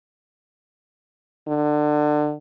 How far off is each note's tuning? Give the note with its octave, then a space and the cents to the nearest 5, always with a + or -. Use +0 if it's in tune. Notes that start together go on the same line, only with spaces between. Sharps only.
D3 +25